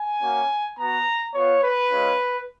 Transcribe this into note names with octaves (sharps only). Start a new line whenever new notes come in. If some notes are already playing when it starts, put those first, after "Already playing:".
Already playing: G#5
A#3 C#4 F#4
B3 F#4 A#5
B3 F4 C#5
B4
G#3 C#4 F4